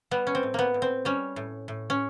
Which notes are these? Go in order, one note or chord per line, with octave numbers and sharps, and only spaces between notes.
G3 B3
C#4
C4
A2
A#3 B3
A2
C4
G3 C#4
A2
A2
C#4